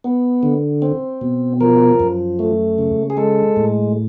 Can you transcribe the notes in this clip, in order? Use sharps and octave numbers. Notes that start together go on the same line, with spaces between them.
B3
D3
C4
B2
F3 A#4
F#2
A3
C#3
G#4
G#3 A4
A2